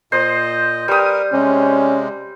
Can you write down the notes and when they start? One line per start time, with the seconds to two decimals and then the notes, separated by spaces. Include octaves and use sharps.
0.12 A#2 C5 D#5
0.88 G3 A#4 B4 D#6
1.33 C3 G#3 C#4